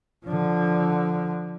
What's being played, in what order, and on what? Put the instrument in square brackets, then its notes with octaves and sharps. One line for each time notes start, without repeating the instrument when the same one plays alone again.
[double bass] D3 F3